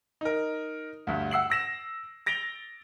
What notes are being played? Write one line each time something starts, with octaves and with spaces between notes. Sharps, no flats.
D#4 A#4
D2 G2
F#5 E6 C7 F#7
E6 A#6 E7
A6 A#6 D7 F7 G7